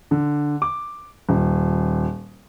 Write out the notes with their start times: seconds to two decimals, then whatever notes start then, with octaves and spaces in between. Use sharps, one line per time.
0.11 D3
0.62 D6
1.29 D#1